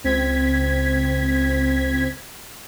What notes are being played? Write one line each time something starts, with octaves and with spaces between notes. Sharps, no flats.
C#2 C4 G#6 B6